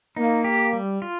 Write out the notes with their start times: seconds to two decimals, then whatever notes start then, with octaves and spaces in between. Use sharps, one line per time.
0.16 A#3 D#4
0.44 G4
0.73 G3
1.02 F4